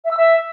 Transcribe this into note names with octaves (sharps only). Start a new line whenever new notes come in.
E5
E6
E5